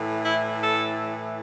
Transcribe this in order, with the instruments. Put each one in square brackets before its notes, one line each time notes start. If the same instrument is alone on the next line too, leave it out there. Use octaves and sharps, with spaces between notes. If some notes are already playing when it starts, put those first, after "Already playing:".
Already playing: [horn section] A2 E3
E4
A4